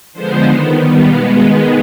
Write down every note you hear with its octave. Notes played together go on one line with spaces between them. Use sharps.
D3 F3 G#3 B3 C5
D#3 B3
D#3 G3 B3
B2 G#3 B3 F5
D#3 G#3 B3 D#5